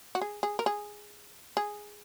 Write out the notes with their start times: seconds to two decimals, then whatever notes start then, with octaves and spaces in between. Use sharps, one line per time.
0.15 F#4
0.22 G#4
0.43 G#4
0.59 A#4
0.66 G#4
1.57 G#4